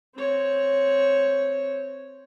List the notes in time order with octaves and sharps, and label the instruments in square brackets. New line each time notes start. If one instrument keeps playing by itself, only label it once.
[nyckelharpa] C4 C#5